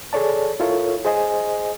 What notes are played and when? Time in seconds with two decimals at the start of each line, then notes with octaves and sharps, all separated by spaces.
0.13 G#4 A4 C#5 D5 A5
0.60 E4 F4 A4 A#4 C#5
1.05 G#4 C5 D#5 G#5